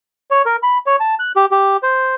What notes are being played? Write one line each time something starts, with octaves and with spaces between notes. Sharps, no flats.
C#5
A#4
B5
C#5
A5
F#6
G4
G4
C5